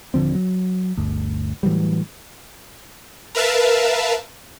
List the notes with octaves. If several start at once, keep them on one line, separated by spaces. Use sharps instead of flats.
D#1 D3 F3 C4
F#3
G1 D2
A2 E3 F#3 G3
A#4 B4 E5 F5 A5